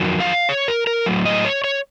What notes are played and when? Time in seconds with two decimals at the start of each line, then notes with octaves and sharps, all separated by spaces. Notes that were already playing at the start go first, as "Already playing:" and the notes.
Already playing: F2 D#3 F#3
0.20 F5
0.49 C#5
0.68 A#4
0.87 A#4
1.06 A2 F#3
1.25 D#5
1.45 C#5
1.64 C#5